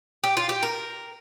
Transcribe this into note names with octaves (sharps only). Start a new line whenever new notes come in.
G4
F4
G4
A#4